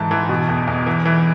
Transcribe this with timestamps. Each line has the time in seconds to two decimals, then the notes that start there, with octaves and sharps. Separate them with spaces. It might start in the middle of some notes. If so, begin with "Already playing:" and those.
Already playing: G#2 E3 A5
0.11 E3
0.29 B2
0.49 E2
0.67 E2
0.87 E3
1.05 E3